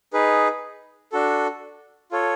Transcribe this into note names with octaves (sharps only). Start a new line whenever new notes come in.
D#4 G#4 B4
D4 F#4 A4
F4 A4 C#5